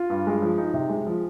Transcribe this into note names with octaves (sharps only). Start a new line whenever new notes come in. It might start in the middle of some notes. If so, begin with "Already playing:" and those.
Already playing: F4
G2
G#3
F3
D#4
C3
G#3
F3